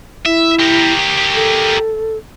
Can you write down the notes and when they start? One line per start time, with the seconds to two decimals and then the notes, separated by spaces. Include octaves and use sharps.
0.25 E4 E5
0.59 G4 A#4
1.34 A4